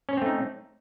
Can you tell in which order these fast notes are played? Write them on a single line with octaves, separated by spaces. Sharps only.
C#4 C#5 C4 A3 D#4